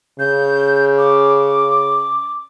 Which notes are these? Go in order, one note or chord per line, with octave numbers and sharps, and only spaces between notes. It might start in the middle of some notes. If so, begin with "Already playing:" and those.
C#3 G6
D6